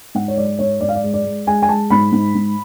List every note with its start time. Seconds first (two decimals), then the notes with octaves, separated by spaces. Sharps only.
0.15 G#2 F#5
0.28 C#5
0.37 G#3 D5
0.59 G#2 C#5
0.81 G#2 D5
0.89 F5
0.95 D5
1.04 G#3
1.14 D5
1.25 G#3
1.47 G#3 G#5
1.62 G#5
1.68 G#3 A5
1.90 G#2 B5
2.12 G#2
2.35 G#2